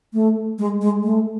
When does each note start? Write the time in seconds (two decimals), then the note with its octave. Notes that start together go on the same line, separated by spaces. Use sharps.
0.14 A3
0.59 G#3
0.82 G#3
1.04 A3